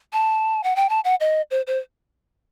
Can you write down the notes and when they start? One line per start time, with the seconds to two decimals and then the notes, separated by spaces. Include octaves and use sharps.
0.13 A5
0.64 F#5
0.76 G5
0.89 A5
1.05 F#5
1.20 D#5
1.51 C5
1.67 C5